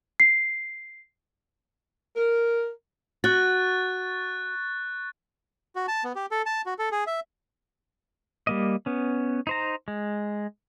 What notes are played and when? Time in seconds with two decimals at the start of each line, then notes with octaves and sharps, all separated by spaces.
0.20 C7
2.17 A#4
3.24 F#4 C#6 F#6 A6
5.76 F#4
5.88 A5
6.04 B3
6.16 G4
6.31 A4
6.46 A5
6.66 F#4
6.79 A4
6.92 G#4
7.07 E5
8.47 G3 A#3 D#5
8.86 B3 C#4
9.47 D#4 C5 A#5
9.88 G#3